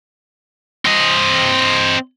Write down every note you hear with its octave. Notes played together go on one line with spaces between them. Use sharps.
C4 D#5